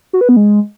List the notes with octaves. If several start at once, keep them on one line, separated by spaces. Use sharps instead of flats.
F#4
B4
B3
G#3